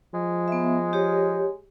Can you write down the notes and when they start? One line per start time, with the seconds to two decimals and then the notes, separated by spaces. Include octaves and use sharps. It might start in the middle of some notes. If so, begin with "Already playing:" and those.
0.14 F3 G#3
0.48 B3 E5
0.93 G4 C#5